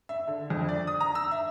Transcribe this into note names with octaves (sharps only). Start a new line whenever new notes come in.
E5
D3
F2
D5
D#6
A#5
E6
E5